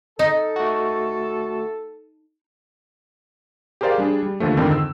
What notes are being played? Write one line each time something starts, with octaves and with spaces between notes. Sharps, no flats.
D#4 A4
A3 F#4
G4 G#4 A#4 C5 D5 F5
G3 D4 G#4
G3
D#2 D3 F3 A3
F2 G#2 D3 D#3 C4
E6